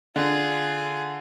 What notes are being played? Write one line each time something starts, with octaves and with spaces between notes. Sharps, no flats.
D3 F4 G#4